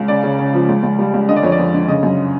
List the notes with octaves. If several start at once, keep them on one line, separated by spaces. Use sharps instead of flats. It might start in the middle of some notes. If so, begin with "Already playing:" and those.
Already playing: C#2
C#3 D5
C#3
C#3
F3
C#2
C#2
G3
C#2
D3 D#5
D5
F2 C#5
D5
F2
D3
C#3 D#5
F#2